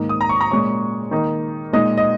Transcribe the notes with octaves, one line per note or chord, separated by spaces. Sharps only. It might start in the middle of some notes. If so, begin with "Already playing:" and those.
Already playing: G#2 D#3 A#3 D#4
D#6
A#5
C#6
A#5
A#2 G#3 C#4 C#6
D#3 A#3 D#4
A#2 G#3 D#4 D#5
D#5